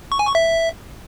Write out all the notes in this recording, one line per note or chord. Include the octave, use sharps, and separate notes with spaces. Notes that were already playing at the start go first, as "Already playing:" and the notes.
C#6
G#5
C#6
E5